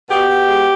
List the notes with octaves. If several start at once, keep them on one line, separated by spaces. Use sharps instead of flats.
B2 G4
B2
G#3